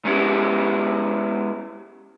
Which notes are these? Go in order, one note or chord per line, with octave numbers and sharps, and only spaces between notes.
G#3 B3 C#4 E4 G4